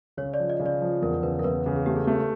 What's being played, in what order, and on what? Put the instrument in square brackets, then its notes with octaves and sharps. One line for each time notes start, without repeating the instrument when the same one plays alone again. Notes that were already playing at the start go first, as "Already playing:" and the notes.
[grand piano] C#3 [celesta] C#5
[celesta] D5
[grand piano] F3
[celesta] D#5
[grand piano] C#3
[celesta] D5
[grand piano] F3
[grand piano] E2 [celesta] A#4
[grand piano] C#3 [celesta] B4
[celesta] A#4
[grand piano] E2 [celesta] B4
[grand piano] C#3
[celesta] G#4
[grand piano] A3 [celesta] G4
[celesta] G#4
[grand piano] A3 [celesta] G4